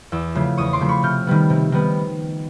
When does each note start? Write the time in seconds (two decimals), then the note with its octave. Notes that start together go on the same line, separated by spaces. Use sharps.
0.12 E2 D6 E6
0.35 C#3 F3 A3
0.57 E2 C#6 D#6
0.73 C6 D6
0.80 C#3 F3 A3
0.89 B5 C#6
1.03 C3 F6 G6
1.27 D#3 G3 B3
1.50 C3
1.72 D#3 G3 B3